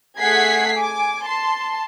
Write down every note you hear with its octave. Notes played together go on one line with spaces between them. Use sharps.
A3 G#4 F#5 G#6 B6 C7
G#5 D6
A5 C6